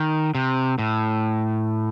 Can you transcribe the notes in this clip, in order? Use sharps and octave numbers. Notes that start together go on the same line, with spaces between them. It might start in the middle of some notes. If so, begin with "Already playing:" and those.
Already playing: D#3
C3
A2